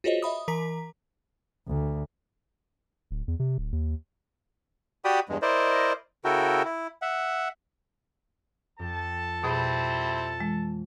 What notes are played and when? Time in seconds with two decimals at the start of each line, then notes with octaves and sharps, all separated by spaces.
0.04 F4 F#4 G#4 C5 C#5 D#5
0.22 D#5 E5 B5 D#6
0.48 E3 A#4 A#5 B6
1.68 D2
3.11 D1
3.28 E2
3.39 C3
3.58 D1
3.72 D#2
5.05 F#4 G4 D5 G5 B5 D#6
5.29 E2 G2 G#3
5.42 E4 A#4 C5 D5 D#5
6.25 C#3 E4 F#4 A4 A#4 G5
6.65 E4
7.02 E5 F#5
8.79 F2 A4 G5 A5
9.44 B2 G3 C4 E4 G#4 B5
10.40 E3 G#3